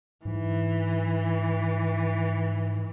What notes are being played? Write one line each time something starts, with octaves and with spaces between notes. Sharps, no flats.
G#2 E3